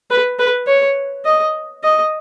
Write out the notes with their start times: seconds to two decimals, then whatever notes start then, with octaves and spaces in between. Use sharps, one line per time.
0.11 B4
0.39 B4
0.67 C#5
1.25 D#5
1.84 D#5